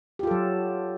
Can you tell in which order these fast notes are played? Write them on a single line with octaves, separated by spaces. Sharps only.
G4 F4 A4 F#3